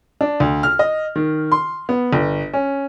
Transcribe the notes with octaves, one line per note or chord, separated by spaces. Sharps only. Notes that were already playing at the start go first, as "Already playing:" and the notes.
D4
D2
F6
D#5
D#3
C6
B3
G1
C#4